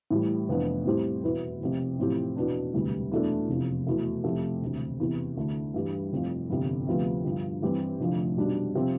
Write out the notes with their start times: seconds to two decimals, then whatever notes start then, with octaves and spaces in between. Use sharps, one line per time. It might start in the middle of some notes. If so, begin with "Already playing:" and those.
0.10 A2 E3 G3
0.48 F1 F2 E3 B3 D4
0.86 A2 G3 C4 G4 C5
1.23 E2 B2 B3 E4 B4
1.61 F1 F2 C3
1.99 A1 A2 F3 C4 G4
2.36 E2 B2 B3 D4
2.74 E1 D2 C3 E3 G3
3.11 E2 B2 A3 D4 A4
3.49 F1 E2 C3 F3
3.87 E2 B2 A3
4.24 F2 C3 F3 A3
4.62 E1 D2 C3
5.00 E2 C3 E3
5.37 D2 D3 A3
5.74 G2 E3 G3
6.12 F1 F2 C3 F3
6.50 G1 F2 C3
6.87 D2 C3 F3 B3
7.25 G2 D3 F3
7.62 G2 E3 G3 C4 G4
7.99 F1 F2 D3 F3 A3
8.37 B1 B2 G3 D4
8.75 C3 F3 C4